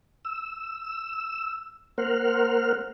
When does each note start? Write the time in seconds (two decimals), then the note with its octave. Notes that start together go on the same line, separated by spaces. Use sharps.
0.25 E6
1.98 A#3 A#4 C5 F#5 F6